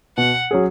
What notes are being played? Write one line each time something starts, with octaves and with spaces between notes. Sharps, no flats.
B2 F#5
F#3 C#4 G#4